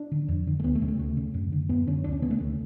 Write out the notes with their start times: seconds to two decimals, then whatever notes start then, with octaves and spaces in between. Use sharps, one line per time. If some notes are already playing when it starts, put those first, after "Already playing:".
Already playing: D4
0.12 D3
0.28 F2
0.47 D3
0.60 A3
0.64 D2 B3
0.75 A3
0.81 C#3
0.88 A3
0.99 D2
1.17 C#3
1.34 F#2
1.52 D3
1.69 F#2 B3
1.87 D3 C#4
2.04 D2 D4
2.13 C#4
2.22 C#3 B3
2.31 A3
2.40 D2